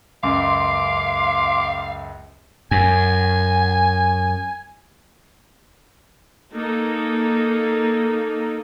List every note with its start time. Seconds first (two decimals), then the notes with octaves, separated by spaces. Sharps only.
0.23 C#2 F#2 F5 C6 D6
2.71 F#2 G#5
6.53 A#3 D#4 A4